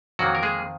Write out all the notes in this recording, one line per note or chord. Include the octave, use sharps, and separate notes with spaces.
F2 D#3 F#3 A#3 F#4
A#4
G#3 G#4